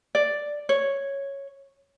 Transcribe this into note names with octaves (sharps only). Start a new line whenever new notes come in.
D5
C#5